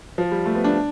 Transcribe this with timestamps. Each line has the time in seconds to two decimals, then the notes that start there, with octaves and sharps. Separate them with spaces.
0.18 F3
0.32 G3
0.46 A3
0.55 B3
0.64 D4